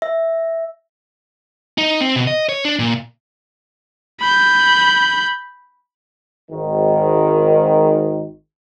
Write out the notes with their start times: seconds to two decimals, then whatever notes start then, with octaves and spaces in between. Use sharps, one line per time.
0.02 E5
1.78 D#4
2.01 C4
2.16 B2
2.27 D#5
2.49 C#5
2.65 D4
2.79 A#2
4.20 B5 G6
6.51 G#1 D#3